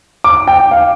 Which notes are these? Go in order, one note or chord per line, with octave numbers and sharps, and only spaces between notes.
D6
G5
F5